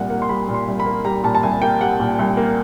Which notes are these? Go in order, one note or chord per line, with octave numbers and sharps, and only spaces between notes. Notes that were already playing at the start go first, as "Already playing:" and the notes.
Already playing: C2 A#2 G3 F#5
A#3 F#5
C6
G3 B5
A#2
C6
C2
B5
A#3
G3 A#5
A#2 A5
A5
C2 G#5
A#3 G5
G3 F#5
A#2
C2
A#3